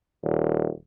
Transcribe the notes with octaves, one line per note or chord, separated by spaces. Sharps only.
D#1